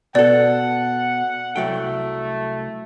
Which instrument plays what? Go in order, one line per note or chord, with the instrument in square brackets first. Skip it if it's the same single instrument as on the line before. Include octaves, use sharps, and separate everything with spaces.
[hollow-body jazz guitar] B2 A4 [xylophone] D5 [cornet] F#5
[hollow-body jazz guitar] C2 F#3 G5 [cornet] A3